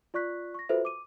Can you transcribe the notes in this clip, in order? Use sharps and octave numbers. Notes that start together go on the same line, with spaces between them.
F4 D5 C#6 F#6 B6
C#6 A#6
F4 F#4 A4 B4 C5 E5
D6 D#7